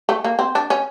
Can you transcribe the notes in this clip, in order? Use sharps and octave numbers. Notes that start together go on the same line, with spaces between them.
A3
A#3
C4
D4
C#4